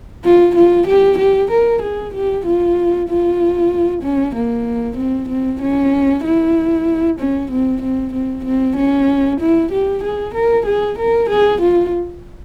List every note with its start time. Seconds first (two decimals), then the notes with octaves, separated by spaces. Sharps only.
0.25 F4
0.56 F4
0.87 G4
1.18 G4
1.51 A#4
1.82 G#4
2.14 G4
2.46 F4
3.09 F4
4.02 C#4
4.35 A#3
4.97 C4
5.29 C4
5.61 C#4
6.24 E4
7.19 C#4
7.51 C4
7.82 C4
8.13 C4
8.45 C4
8.76 C#4
9.40 E4
9.72 G4
10.03 G#4
10.34 A#4
10.66 G#4
10.98 A#4
11.29 G#4
11.61 F4